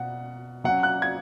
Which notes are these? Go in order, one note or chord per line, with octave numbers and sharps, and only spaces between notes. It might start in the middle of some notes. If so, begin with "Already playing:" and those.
Already playing: B2 F#5
F#3 C#4 F#5
F#6
G#6